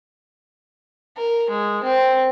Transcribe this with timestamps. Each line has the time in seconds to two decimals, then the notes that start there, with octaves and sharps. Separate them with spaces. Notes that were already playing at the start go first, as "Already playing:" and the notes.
1.18 A#4
1.50 G#3
1.84 C4